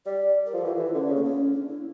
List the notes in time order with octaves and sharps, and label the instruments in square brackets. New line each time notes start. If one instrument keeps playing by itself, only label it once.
[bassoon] G3 [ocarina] D5
[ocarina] A#4
[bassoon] F3 [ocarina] A4
[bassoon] E3 [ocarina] G4
[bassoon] E3 [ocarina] F4
[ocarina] E4
[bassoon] D3 [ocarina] C#4
[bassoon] C#3
[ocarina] A#3
C#4
D4
E4